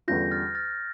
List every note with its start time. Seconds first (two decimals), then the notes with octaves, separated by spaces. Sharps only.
0.08 E2 D3 G3 C#4 F4 G6 A#6
0.31 F6 A6
0.55 F6 A6